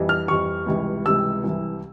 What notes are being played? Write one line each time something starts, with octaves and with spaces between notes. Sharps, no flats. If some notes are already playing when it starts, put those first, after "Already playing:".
Already playing: F2 E3 G3
F6
F2 E3 G3 C#6
C#2 C3 E3 G3
C#2 C3 E3 G3 E6
C2 C3 E3